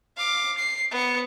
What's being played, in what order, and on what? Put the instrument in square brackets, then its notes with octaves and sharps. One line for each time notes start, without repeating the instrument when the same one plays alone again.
[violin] F5 D6
C7
B3 C#7